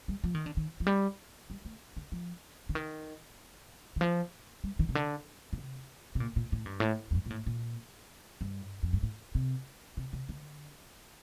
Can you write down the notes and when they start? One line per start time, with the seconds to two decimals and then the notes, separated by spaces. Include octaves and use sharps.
0.08 G3
0.24 F3
0.35 D#3
0.46 D3
0.57 D#3
0.80 F3
0.87 G3
1.50 G3
1.65 A3
1.97 D3
2.12 F3
2.69 D3
2.75 D#3
3.96 D#3
4.01 F3
4.64 G3
4.79 D#3
4.89 C3
4.95 D3
5.53 A#2
5.58 C3
6.15 C3
6.20 A#2
6.36 A#2
6.52 A2
6.66 G2
6.80 A2
7.11 F2
7.15 G2
7.26 A#2
7.30 A2
7.46 A#2
8.41 G2
8.83 F2
8.93 G2
9.03 A2
9.35 C3
9.97 C3
10.13 C3
10.29 D3